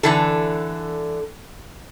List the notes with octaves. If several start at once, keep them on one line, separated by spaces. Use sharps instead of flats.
D3 E3 A4